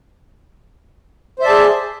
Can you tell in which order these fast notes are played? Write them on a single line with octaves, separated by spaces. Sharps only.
C5 E5 D5 A5 G#4